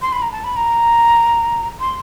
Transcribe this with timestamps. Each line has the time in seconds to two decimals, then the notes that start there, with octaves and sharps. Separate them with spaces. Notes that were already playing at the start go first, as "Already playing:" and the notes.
0.02 C6
0.12 B5
0.22 A#5
0.32 A5
0.44 B5
0.56 A#5
1.80 C6